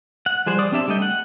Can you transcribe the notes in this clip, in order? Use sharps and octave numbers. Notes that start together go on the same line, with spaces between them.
F#5
F3 G3 G#4 C5
D5 D6 D#6
C4 D4 G4 E5 A5
G3 A3 A4 D#5 G5
F#5